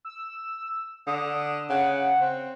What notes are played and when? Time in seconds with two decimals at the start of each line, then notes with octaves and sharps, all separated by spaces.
0.05 E6
1.07 D3 D#6
1.70 C#3 F#5
2.21 C4